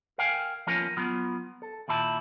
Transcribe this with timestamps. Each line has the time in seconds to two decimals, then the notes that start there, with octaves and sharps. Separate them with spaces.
0.18 A#4 F5 G5 G#5
0.67 F3 A#3 B3 C#4 F4 A#4
0.97 F#3 B3 F4
1.62 A4
1.88 D#2 A#2 E4 A5